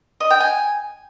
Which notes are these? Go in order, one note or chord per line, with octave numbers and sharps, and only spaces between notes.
D#5
G5
G#5